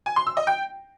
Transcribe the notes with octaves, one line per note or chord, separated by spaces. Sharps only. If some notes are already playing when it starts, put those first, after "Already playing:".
G#5
C6
E6
D#5
G5